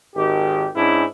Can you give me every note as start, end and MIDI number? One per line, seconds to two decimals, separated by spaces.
0.15 0.66 32
0.15 0.66 51
0.15 0.66 67
0.75 1.04 44
0.75 1.04 61
0.75 1.04 62
0.75 1.04 64